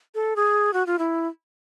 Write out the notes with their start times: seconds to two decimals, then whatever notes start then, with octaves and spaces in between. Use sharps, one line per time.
0.15 A4
0.36 G#4
0.73 F#4
0.86 F4
0.99 E4